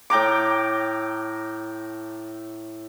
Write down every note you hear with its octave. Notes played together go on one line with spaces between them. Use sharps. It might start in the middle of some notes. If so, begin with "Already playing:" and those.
A2 G5 A#5 D6